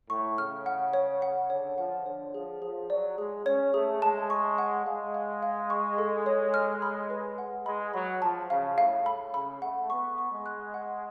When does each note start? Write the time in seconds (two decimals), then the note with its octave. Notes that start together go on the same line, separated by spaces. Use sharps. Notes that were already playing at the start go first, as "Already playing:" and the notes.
0.10 A2 C#6
0.38 C#3 F6
0.66 F#5
0.94 C#5
1.22 F#5
1.50 D3 C#5
1.78 F3 F#5
2.06 D3 C#5
2.34 F3 G#4
2.62 F3 G#4
2.90 F#3 D5
3.18 G#3 G#4
3.46 C#4 C#5
3.74 A3 G#4
4.02 G#3 A5
4.30 C#6
4.58 F#5
4.86 G#3 F5
5.14 F5
5.43 F5
5.70 C#6
5.98 A4
6.26 C#5
6.54 F6
6.82 B5
7.10 B4
7.38 F#5
7.66 G#3 B5
7.94 F#3 B5
8.22 F3 A5
8.50 C#3 F5
8.78 A2 F5
9.06 B5
9.34 C#3 B5
9.62 A3 F#5
9.90 B3 C#6
10.18 C#6
10.32 G#3
10.46 F#6
10.74 F#5